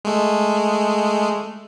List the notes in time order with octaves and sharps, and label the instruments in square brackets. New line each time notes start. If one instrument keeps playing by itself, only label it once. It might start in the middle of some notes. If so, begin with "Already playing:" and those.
[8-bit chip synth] G#3 A3